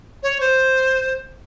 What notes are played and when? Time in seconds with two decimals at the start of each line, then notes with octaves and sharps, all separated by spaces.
0.23 C#5
0.41 C5